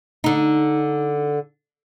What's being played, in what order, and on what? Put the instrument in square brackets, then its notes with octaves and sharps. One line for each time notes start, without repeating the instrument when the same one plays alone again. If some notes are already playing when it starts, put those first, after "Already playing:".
[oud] D3 D#4